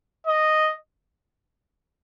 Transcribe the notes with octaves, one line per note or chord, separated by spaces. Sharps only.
D#5